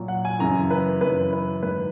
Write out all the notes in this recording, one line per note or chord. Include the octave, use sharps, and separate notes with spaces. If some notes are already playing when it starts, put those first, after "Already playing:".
Already playing: A#2 F#3
F#5
G#5
F#2 C#3 E3 A#5
B4
F#2 C#3 E3 B4
B4
G#2 D#3 F#3 B4